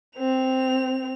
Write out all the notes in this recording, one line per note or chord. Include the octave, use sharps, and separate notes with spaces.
C4 F7